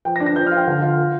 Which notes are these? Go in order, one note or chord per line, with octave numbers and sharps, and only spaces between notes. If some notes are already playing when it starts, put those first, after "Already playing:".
F3 G5
A#6
D4
A#6
F3 G6
F6
F4
G5
D3 F5
F4
F4